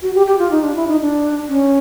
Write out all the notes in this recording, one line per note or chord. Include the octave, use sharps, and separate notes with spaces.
F#4
G4
G4
F4
D#4
D4
E4
D#4
D4
C#4